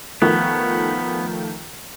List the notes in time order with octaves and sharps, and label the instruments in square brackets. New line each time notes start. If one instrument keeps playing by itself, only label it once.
[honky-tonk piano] D#3 F3 A3 [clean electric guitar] B3